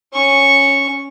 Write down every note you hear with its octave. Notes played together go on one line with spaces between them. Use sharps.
C#4 C#6